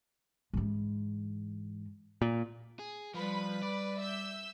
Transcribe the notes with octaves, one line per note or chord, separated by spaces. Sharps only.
G#2 E3
A#2
G#4
F3 G3 B4 B5
D5
E5 E6 G6